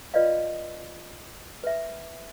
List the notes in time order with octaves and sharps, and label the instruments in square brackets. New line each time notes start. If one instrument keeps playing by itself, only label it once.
[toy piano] F4 B4 D5 D#5 F5
B4 E5